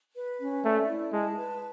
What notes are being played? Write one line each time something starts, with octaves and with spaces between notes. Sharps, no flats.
B4
C#4
A3 D5
E4
G#3 A5
B4